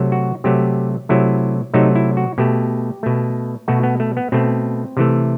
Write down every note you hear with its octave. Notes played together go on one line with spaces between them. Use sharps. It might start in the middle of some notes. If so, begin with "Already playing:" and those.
Already playing: C3 F#3 A3
F#4
C3 F#3 A3 G4
C3 F#3 A3 E4
C3 F#3 A3 D#4
E4
F#4
B2 A3 G4
B2 A3
B2 A3 F#4
B3
A3
B3
B2 A3 C4
C3 E3 A3